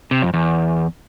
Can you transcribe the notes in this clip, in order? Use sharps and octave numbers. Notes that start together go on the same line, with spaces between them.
C3
F2
E2